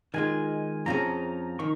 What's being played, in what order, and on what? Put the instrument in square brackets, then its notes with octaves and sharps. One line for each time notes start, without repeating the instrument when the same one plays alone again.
[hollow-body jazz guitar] D#3 G#3 F4 [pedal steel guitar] G#5
[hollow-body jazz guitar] F2 F3 C#4 G#4 [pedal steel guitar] A#5
[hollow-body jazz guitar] D#3 [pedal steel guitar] C#6